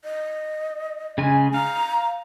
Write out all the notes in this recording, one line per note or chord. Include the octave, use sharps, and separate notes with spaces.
D#5
C#3 G#3 G#5
F5 A#5